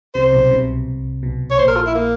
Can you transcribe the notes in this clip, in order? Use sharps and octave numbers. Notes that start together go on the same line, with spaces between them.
C2 C3 C5
B1 B2
C2 C3
B1 B2
C#5
A#1 A#2 C5
A#4
F4
E4
A#3